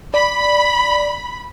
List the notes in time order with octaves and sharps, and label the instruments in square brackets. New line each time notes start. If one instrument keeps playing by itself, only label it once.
[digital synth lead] D5 [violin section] B5